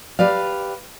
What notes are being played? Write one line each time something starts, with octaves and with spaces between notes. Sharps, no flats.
G4 B4 D5 F5